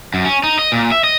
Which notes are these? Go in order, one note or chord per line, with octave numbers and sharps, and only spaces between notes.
F#2
C#4
D#4
D#5
A#2
E5
D#5